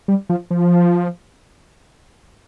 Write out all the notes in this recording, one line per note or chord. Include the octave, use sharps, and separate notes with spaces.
G3
F3
F3